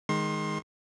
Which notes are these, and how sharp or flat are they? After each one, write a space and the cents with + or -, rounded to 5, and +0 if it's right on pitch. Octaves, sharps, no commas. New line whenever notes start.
D#3 +0 G#3 +0 C6 +30